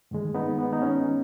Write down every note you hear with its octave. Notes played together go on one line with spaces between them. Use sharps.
G#2 D#3 G#3
B3 D#4
B3
D#4
C#4